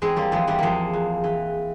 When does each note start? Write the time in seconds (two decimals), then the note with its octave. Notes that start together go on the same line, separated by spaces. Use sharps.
0.02 E2 G#3 C4
0.16 G3 A#3
0.32 E3 F3 G#3
0.47 E3 G3
0.59 E2 F3 G#3 A#3
0.93 E2
1.24 E3